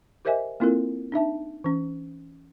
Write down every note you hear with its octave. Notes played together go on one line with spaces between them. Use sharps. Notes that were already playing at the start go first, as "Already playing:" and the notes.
G4 A#4 C5 D#5 E5 G#5
A#3 C4 E4 F4 A4 A#4
D4 D#4 E5 A5
E3 C#4